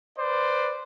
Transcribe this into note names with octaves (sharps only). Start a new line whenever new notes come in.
B4 C5 D5